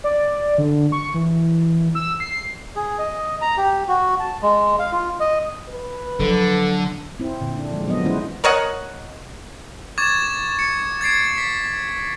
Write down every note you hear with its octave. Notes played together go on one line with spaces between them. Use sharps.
D5
D3
C#6
E3
E6
C7
G#4
D#5
A#5
G4
F#4
A5
G#3
F5
F4
D#5
B4
D3 F3 F#3 A4
C4 E4
A#2 D3
D4
F3 G#3
F#3 B3 D#5
D#3 G#3 C#4 E4 B4 C5
A#4 C#5 D#5 F#5
C#6 D6 G#6 A6 E7
C#7
G#6 A6 C7 D7
B6